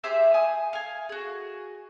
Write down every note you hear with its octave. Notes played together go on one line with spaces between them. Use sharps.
G4 G#4 C5 E5
G#5 D#6
F5 G#5
F#4 G#4